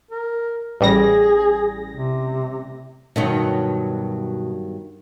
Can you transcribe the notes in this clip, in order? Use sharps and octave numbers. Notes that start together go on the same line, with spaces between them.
A#4
A1 G3 G#4 A#6
C3
G2 B2 D#3 F#3 B3 D#4